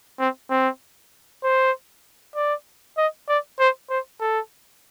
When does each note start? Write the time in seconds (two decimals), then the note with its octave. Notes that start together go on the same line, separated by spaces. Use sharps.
0.19 C4
0.50 C4
1.43 C5
2.36 D5
2.98 D#5
3.29 D5
3.60 C5
3.90 C5
4.21 A4